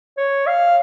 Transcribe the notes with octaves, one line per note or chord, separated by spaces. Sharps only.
C#5
F5